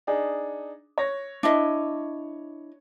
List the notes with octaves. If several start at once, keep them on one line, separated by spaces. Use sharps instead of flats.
D4 D#4 G#4
C#5 A#6
D4 E4 D#5